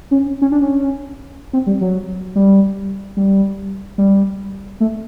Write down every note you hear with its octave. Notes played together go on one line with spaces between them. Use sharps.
C#4
C#4
D4
C#4
C4
G3
F#3
G3
G3
G3
A3